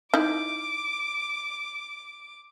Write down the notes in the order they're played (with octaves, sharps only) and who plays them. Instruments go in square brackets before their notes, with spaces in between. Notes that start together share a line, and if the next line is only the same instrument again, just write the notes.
[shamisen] D#4 E4 [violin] D6